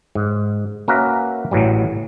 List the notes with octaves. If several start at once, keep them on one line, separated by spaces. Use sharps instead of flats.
G#2
A#3 C#4 F#4 A#4 B4 E5
A1 A2 E3 F#3 G3